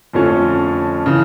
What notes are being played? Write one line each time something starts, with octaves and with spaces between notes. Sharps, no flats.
F2 D3 F3 A3 C#4
C#3 E3